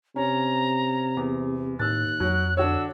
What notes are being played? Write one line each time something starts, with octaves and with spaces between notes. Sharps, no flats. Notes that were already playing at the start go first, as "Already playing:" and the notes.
C3 C#4 A#5
E2
D#2 A2 E6 F#6 A6
F2 F#3
D3 D4 F#4 C#5 E6